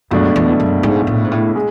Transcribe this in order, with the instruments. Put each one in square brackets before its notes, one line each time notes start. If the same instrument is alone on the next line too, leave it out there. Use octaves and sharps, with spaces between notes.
[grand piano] C#2 B2 A3 D4 [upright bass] F#2
[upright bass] E2
F#2
G#2
A2
G#2
A2
[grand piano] G#3